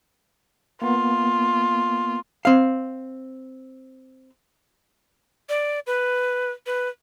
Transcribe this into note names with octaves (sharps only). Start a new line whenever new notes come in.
A#3 B3 F4
C4 F5
D5
B4
B4